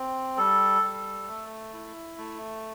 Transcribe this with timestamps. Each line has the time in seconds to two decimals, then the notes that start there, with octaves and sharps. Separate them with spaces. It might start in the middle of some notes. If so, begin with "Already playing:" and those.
Already playing: C4
0.37 G3 A4
0.82 G3
1.28 A3
1.73 E4
2.18 A3